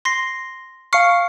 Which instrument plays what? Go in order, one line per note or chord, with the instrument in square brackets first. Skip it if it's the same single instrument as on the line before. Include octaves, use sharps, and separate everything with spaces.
[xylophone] C6 A#6 C7
[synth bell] F5 C#6 [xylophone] F6 C7 C#7